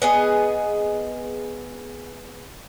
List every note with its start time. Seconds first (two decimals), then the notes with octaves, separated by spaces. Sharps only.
0.02 B3 G#4 D#5